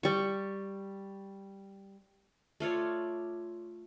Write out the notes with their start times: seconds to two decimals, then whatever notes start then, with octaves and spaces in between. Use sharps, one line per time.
0.03 G3 C#6
2.60 A3 F4 C#5 D5